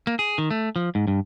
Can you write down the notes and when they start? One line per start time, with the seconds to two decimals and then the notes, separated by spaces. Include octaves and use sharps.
0.07 A#3
0.19 G#4
0.38 D#3
0.51 A3
0.76 F3
0.95 G#2
1.07 G2